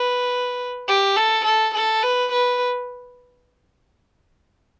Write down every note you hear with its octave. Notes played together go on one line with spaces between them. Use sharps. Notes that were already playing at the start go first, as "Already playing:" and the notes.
Already playing: B4
G4
A4
A4
A4
B4
B4